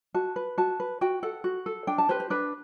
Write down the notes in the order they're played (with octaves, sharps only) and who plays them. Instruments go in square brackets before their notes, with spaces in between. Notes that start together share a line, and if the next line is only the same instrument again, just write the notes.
[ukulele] F#4 A5
B4
F#4 A5
B4
F#4 G5
A4 F#5
F#4
A4
D4 G5
A5
G4 B4 C5
C5
D4 B4